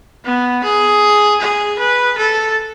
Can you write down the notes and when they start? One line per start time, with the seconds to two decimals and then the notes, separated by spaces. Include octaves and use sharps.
0.25 B3
0.64 G#4
1.41 G#4
1.79 B4
2.18 A4